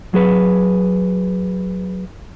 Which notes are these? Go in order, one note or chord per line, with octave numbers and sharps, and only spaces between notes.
F#3 G#4 B4